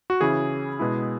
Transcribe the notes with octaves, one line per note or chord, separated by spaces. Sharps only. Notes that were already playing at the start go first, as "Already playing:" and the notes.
F#4
C#3 E3 C#4 E4 G#4
B2 G#3 B3 E4